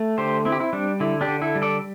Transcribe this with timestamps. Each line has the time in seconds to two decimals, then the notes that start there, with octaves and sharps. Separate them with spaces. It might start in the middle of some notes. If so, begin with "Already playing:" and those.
Already playing: A3
0.18 D3 G4 C5
0.45 C4 E4
0.52 G4
0.60 E4
0.73 G3 D4
1.00 D3 E4
1.21 D4 G4
1.28 D3
1.42 E4 A4
1.55 G3
1.62 A4 D5